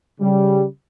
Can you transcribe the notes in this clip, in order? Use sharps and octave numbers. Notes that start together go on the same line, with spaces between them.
C#3 G3